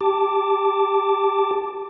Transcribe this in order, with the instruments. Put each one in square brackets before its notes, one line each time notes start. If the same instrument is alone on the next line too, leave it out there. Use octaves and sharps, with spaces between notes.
[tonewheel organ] G4 A5 D6